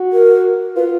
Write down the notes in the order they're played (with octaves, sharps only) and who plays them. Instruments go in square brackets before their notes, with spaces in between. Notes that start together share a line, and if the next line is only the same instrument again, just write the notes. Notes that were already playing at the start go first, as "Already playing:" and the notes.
Already playing: [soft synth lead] F#4
[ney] A#4
[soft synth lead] F4 [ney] B4